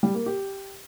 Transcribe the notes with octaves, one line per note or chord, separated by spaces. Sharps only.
G3
A#3
G4